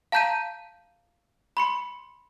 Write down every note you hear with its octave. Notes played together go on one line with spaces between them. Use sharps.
F5 A5 A#5 G6 B6 D#7
B5 C6 C#7